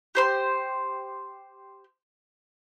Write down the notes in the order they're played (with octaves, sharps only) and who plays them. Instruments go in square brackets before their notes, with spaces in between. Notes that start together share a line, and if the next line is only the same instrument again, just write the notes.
[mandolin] G4 C5 C6